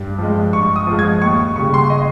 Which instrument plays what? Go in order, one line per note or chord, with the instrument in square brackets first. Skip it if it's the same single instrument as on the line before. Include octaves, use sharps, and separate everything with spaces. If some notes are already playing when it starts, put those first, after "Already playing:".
Already playing: [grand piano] G2
F3 G#3
G2 C#6
D#6
F3 G#3
G#6
D#2 C#6
C#3 G3 C#6
C6
D#5